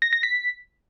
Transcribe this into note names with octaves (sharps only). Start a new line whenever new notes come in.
A#6
A#6
B6